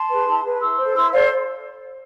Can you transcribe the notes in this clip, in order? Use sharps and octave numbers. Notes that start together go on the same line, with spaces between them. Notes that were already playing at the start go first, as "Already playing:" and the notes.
Already playing: A5 C6
G#4 B4
E4
G#4 B4
E4 C6 E6
A4 C5
E4 C6 E6
A4 C5 D5 F5